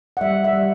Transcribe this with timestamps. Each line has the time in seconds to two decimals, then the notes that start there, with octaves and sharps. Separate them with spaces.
0.17 F#5
0.21 G3 E5
0.44 E5
0.53 G3